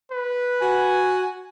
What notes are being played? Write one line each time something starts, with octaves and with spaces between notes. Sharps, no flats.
B4
F#4 G#5